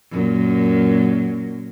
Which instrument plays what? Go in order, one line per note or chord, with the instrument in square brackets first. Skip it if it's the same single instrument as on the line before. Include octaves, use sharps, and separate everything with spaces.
[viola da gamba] F#2 A#2